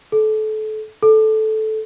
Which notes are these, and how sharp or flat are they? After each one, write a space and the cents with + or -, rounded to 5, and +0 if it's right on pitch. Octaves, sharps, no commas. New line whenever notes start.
A4 -30
A4 -15